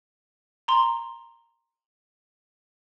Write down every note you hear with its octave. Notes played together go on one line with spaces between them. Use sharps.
A#5 C6